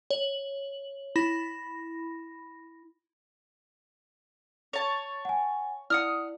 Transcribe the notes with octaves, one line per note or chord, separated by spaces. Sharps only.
C#5 F#7
E4 B5 A#6
C#5 A5
F#5 G#5
E4 D5 F#5 D#6 F6